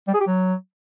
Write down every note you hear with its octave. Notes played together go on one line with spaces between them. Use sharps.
G3
G#4
G4
F#3